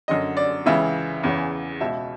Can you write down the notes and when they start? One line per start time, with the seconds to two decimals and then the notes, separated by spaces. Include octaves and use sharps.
0.08 F#2 D3 D#5
0.37 D5
0.66 C#2 C#3 E3 E5
1.23 E2 C#3 E3
1.81 C#2 B2 E5